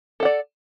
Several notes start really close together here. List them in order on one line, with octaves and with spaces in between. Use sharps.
A4 F#5 D5